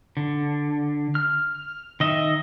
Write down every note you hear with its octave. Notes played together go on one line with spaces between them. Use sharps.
D3
F6
D#3 D#5 E5